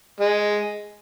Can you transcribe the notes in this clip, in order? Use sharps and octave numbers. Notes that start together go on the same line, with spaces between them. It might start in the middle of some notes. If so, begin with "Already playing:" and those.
G#3